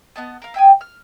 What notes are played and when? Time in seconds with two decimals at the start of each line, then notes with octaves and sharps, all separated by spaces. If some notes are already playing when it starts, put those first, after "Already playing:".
0.16 B3 D#5 A5
0.42 A#4 F5
0.54 E5 G5 G#5 D#6
0.81 F6